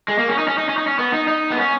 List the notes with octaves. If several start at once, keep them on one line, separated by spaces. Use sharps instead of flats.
G#3
A#3
C#4
D#4
C#4
D#4
C#4
D#4
C#4
B3
D#4
D#4
B3
C#4